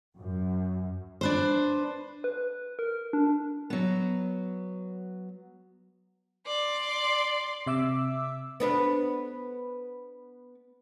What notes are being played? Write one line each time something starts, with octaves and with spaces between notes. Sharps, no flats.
F#2
D4 B4 C5
B4
A#4
D4
F#3 B3
D5 C6
C3 E5 D6 E6
B3 D4 B4